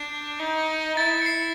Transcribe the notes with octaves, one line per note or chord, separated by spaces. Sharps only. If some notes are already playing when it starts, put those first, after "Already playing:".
Already playing: D4 G6
D#4
E4 A6
C#7
C7